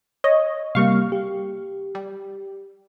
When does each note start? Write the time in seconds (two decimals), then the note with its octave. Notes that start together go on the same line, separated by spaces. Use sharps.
0.24 C#5 D#5
0.75 C3 G3 A#3 F5 C#6
1.12 G4
1.95 G3